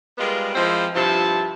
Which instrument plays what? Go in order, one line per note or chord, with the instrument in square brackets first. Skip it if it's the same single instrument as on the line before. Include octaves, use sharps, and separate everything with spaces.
[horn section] G3 G#3 B3 F4 A#4
F3 G#3 C4 E4
G2 C3 F3 E4 A5